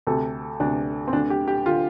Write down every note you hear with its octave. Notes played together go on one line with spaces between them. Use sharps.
D2 C3 A4
D2 C3 D4
C4
D2 D3 D4
G4
G4
D3 F4